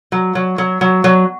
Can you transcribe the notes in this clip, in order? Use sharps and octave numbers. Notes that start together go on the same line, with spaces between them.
F#3
F#3
F#3
F#3
F#3